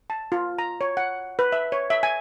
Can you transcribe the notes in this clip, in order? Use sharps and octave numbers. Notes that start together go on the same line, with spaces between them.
A5
F4
A#5
C#5
F#5
B4
E5
C#5
E5
G#5